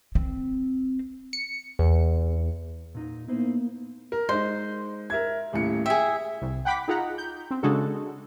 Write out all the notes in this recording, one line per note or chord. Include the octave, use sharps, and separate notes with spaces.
C4
C#7
E2
A#2 D#4
A#3 B3 D#4 E4 C5
A#4
G#3 D#4 C5
A#4 E5 G#6
D#1 A2 C#7
G#4 E5 G5
C2
F#5 G5 B5 D6 B6
D#4 F4 G#4 F#5 A#5
G6
C4
C#3 G#3 D4 F#4 A4